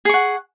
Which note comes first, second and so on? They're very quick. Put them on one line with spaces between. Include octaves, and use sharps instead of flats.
G#4 C#6 F#5